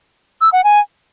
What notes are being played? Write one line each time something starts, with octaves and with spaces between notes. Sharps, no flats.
E6
F#5
G#5